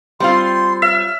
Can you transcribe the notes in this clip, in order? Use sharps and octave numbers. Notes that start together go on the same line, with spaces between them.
G3 C4 F4 C6
E5 F6